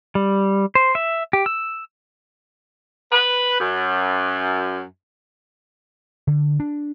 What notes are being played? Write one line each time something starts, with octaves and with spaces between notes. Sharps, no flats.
G3
C5
E5
G4
E6
B4
F#2
D3
D4